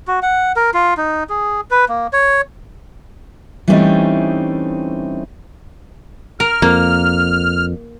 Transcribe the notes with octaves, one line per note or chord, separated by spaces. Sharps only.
F#4
F#5
A#4
F4
D#4
G#4
B4
A#3
C#5
E3 G3 A3 C4 C#4 D#4
A#4 F6
F2 A#3